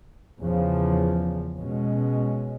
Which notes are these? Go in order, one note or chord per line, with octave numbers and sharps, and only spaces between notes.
E2 C#3 F3
B2 G#3 C#4